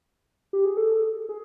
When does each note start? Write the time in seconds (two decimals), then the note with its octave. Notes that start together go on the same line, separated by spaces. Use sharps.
0.53 G4
0.65 G#4
0.77 A4
1.29 G#4